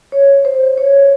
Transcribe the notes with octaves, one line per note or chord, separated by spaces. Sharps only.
C#5
C5
C#5